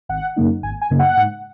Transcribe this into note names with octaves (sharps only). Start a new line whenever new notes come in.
G#1 F#5
F#2 C#3 A#3 D#4
G#1 G#5
G#5
F#2 C#3 A#3 D#4
F#5
G#2